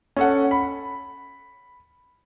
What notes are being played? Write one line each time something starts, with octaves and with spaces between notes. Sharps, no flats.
C#4 A4 F#5
B5